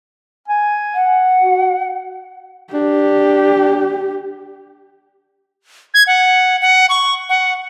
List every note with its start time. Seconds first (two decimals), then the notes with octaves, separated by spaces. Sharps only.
0.48 G#5
0.95 F#5
1.41 F#4
2.74 D4 G4
5.94 G#6
6.07 F#5
6.61 F#5
6.89 C#6
7.29 F#5